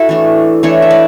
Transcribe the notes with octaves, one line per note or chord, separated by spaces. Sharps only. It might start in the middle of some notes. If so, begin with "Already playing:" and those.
Already playing: E4 F#4 A4
E3 A3 D4
E3 A3 D4 A4 C#5
E5
B4 D5